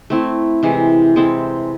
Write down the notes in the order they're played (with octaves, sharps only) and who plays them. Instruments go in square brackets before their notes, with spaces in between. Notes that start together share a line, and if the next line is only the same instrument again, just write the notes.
[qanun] A3 C4 E4
C3 E3 G#3
G#3 C4 E4 A4